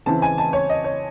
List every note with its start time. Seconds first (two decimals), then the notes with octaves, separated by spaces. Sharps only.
0.06 C#3 E3 C4 E4 A5
0.22 G#5
0.38 A5
0.53 C#5
0.69 D#5
0.84 C#5